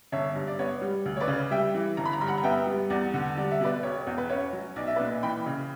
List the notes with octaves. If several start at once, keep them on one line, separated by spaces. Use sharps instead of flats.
G1 C#5 E5
G2
D5
B3 C#5
G3
D2
C#5
B4 D5
C#3
G3 E5 G5
E3
G1 A#5
B5
A#5
G2 B5
F#5 A#5
A#5
B3 E5 G5
G3
E2 D5 F#5
D3
G3 D5
E5
B2 B4 D5
E1 C#5
E2
B4
C#4 C#5
F#3
B1 D5
E5
B4 D5
A#2
E3 G5 B5
C#3